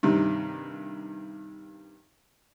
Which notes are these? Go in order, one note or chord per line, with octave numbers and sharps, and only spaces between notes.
G2 C3 D#3